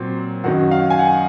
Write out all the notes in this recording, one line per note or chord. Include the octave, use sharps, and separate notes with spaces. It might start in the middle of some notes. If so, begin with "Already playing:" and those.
Already playing: A#2 F#3 C4
F#2 D#3 F#3 F#4
F5
G#5
F#5